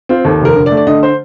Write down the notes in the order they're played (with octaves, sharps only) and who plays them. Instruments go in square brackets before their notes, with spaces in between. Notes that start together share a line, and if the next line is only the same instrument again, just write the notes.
[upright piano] C4 F4
D#2 A4
F1 A#4
D3
D5
A3
D5
D3 D#5
C5